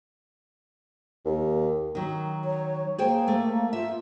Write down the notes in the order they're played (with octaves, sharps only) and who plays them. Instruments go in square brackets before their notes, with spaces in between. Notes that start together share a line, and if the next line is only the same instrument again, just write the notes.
[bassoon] D#2
[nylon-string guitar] D#3 F#3
[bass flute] C#5
[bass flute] A#3 [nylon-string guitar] G#4 C5 G5
[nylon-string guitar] A3
[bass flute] F4 [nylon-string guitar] E5